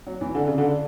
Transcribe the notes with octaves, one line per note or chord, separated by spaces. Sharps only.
F#3
E3
D3
C#3
D3